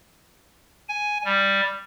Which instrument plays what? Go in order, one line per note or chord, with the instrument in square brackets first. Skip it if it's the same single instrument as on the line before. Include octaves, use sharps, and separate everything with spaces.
[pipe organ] G#5
G3